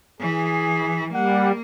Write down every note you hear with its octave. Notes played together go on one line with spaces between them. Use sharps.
E3 G#4
G3 A#3 F#5